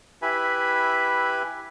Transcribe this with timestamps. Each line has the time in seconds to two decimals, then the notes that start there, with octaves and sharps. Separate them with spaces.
0.22 E4 G4 B4 E5 G#5 B5